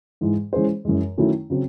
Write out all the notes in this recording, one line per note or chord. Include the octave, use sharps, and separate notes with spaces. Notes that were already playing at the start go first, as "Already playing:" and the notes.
G#2 E3 G#3
E3 G#3 C#4 G#4 C5
F#2 E3 G#3
D#3 F#3 A3 C#4 E4
C#3 F#3 C4